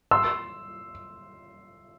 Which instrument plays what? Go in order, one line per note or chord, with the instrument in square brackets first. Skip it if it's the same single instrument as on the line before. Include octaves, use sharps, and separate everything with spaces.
[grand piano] C6 E6